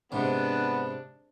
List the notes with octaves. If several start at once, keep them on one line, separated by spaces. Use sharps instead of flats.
G#2 C3 B3 D4